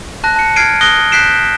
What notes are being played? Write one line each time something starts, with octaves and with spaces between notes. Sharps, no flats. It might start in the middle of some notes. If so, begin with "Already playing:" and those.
A5 F#6 A#6
A5 C#7
F6 G#6 C7 D7 D#7
D#6 F#6 A#6 G7
F#6 G6 B6 C7 D7 E7